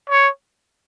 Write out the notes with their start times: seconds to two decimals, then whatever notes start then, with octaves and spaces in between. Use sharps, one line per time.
0.10 C#5